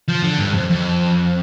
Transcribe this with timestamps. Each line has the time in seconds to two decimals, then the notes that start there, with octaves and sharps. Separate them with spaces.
0.09 F3
0.24 D3
0.39 G2
0.54 F2
0.70 F2